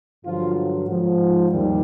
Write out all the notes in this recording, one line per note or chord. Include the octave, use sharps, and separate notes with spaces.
G2 D3 F3 F#3 F4
G#2 F3
D#2 D#3 G3